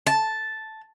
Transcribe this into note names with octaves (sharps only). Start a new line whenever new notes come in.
A5